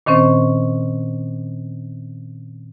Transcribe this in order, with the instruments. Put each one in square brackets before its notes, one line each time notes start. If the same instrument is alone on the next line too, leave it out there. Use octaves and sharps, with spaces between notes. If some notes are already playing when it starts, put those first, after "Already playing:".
[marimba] A#2 D#3 C4 C#4 C5